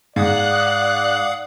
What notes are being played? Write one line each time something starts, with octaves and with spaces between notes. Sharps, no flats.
G#2 D5 F5 F#5 D#6 F#6